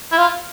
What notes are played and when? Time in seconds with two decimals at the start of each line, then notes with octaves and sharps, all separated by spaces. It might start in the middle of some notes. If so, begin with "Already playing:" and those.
0.12 E4
0.18 F4